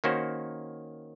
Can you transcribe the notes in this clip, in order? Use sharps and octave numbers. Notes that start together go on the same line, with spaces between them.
D#3 A#3 C#4 F#4 C5